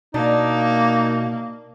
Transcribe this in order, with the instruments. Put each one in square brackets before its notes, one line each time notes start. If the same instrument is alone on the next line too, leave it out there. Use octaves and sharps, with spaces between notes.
[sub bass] B2 [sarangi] A#3 [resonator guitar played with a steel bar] D4 [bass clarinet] D#4